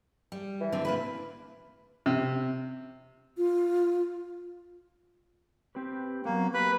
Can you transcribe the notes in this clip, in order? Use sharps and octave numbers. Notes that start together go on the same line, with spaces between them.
G3
E3
D3 C4
A#3 E4 B4
C3
F4
C4 G4 B4
F#3 A#3 B3
A#3 G4 A#4 B4